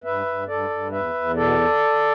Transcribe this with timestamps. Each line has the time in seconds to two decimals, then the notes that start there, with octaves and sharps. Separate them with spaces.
0.04 G2 B4 E5
0.26 G2
0.48 G2 A4 D5
0.70 G2
0.92 E2 B4 E5
1.14 E2
1.35 B2 A4 D5